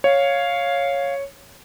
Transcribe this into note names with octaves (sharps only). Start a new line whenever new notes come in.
C#5 F5